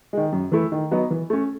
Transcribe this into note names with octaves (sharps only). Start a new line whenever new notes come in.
D#3 G#3
F#2
E3 A3 E4
D#3
F#3 B3 D#4
E3
A3 C#4